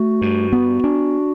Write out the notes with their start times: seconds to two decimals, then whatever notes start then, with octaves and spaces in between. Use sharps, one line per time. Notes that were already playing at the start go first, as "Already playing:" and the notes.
Already playing: A3 F#4
0.21 G2
0.52 B3
0.84 D4